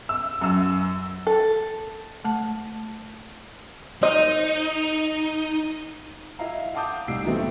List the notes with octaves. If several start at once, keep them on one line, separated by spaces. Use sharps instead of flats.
E6
F#2 E6
A4
A3 A5
D#4 A#4 C5 D#5
E4 D#5 F5 A#5
F5 F#5 A5 D6 D#6 G6
C2 A2 D#4 E6 C7 D7
E3 F#3 A3 B3 C4